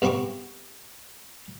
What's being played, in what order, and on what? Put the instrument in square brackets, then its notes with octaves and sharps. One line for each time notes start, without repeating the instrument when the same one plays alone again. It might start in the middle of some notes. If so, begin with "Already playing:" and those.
[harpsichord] G2 B3 C4 B5 C#6 D6